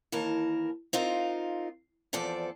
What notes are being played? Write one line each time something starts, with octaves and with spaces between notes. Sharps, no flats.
D#2 E3 A#4 A5
C4 D#4 F4 A#4
E2 F3 C4 A4 D5